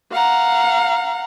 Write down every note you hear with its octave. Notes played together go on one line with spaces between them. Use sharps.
F5 F#5 A#5